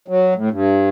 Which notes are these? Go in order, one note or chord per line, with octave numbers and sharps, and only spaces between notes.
F#3
A2
G2